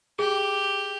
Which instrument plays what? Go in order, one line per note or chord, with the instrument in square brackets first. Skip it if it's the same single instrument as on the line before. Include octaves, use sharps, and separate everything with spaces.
[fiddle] G4 [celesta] G#4